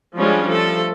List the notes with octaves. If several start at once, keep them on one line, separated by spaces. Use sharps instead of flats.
F3 G3 G#3 C#4 D4 F4
F3 A3 A4